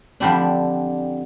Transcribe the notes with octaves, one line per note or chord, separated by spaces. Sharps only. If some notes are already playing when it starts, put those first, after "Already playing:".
F2 D3 G3 D4